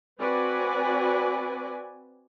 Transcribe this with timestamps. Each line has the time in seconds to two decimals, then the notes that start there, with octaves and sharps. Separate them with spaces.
0.20 C4 F#4 B4 D5 G#5